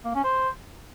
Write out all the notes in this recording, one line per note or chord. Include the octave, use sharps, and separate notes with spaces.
A#3
C#4
C5